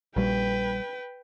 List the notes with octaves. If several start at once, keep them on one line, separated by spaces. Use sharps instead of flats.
A#1 G3 B4 G5